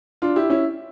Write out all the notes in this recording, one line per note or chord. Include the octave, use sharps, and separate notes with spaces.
D4 F4
E4 G4
C#4 E4